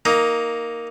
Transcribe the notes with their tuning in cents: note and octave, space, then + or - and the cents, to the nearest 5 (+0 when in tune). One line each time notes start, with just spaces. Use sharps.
A#3 +0 D#4 +10